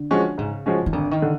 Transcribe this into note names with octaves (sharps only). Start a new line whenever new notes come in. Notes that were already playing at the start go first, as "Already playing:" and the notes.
Already playing: D3
F3 G#3 C#4 F#4
G#2 C#3
F3 G#3 C#4 F#4
D#3
G#1 D3
D#3
D3